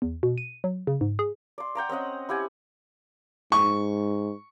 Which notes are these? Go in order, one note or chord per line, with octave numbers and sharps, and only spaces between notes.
E2
B2
D#7
F#3
C#3
G#2
G#4
D5 C6
F#5 G5 A#5 D6
C4 C#4 D#5 F#5
E4 G4 F#5 G#5
G#2 C#6